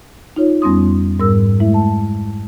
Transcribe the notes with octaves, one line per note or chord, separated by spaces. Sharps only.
D#4 F4 C#5
F2 G3 B3 C#4 C6 D#6
G#2 G3 A#4 E6
G#3 A3 E4 E5
A5